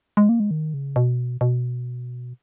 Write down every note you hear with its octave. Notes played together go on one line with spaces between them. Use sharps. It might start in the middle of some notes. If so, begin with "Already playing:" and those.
G#3
A#3
G#3
D#3
C#3
B2
B2